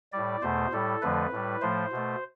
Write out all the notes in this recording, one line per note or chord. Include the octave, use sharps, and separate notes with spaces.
A2 G3 D5
E2 B2 A3 C5
A2 G3 A4
F2 D3 F3 A3 B4
A2 G3
A2 F3 A3 C5
B2 A3